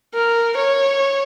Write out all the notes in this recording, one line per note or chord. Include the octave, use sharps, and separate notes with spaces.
A#4
C#5